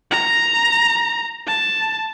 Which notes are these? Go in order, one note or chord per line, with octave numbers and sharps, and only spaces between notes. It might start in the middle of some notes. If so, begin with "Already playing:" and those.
A#5
A5